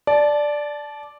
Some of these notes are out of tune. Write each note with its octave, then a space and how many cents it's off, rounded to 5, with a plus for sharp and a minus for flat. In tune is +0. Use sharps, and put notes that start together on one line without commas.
D5 +0 A5 -20